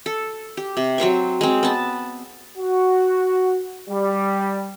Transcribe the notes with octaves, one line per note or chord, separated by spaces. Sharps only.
A4
G4
C3
F#3 C4 C5 C#6
G#3 C4
B3 A5
F#4
G3